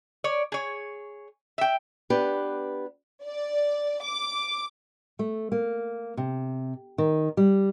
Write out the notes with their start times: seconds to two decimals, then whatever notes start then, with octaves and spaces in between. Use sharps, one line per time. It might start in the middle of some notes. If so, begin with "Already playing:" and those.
0.24 C#5 D5
0.52 G#4 C#5
1.58 E5 G5
2.10 B3 D4 G4 B4
3.24 D5
4.04 D6
5.19 A3
5.52 A#3
6.17 C3
6.98 D#3
7.37 G3